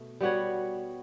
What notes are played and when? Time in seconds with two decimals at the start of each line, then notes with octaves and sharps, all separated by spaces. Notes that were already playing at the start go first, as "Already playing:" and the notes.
Already playing: B2 A3
0.21 G3 B3 F#4 C#5